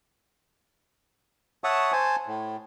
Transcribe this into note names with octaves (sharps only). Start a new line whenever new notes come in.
C#5 E5 F#5 A5 C#6 D#6
C5 G#5 A5
A2